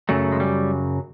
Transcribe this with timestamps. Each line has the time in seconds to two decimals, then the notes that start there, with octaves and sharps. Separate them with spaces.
0.09 F#2 C#3 F#3 A3
0.32 G#3
0.40 G3